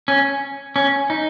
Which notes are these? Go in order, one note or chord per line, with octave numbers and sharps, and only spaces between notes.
C#4
C#4
D#4